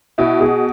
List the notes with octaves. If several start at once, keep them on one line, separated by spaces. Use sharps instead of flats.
B2 E4
B2 G#4